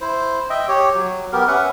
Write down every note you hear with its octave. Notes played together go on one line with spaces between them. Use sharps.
E4 C5
D#5 E5 G5
G4 C#5
F#3
B3 G4 A#4
C#4 B4 E5 F#5